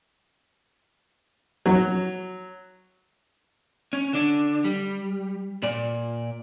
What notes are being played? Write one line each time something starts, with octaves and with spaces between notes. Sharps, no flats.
F#3
C#4
D3 D4
G3
A#2 D5